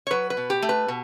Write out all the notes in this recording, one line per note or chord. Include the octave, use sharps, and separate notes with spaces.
C#5
F#3 B4
B4
B2
G4
A3
B4
B2